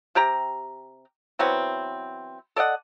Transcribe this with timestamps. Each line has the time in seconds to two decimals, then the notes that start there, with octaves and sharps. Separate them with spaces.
0.15 C3 G4 G5 A#5
1.39 E3 F#3 B3 C4
2.56 A4 D5 D#5 F#5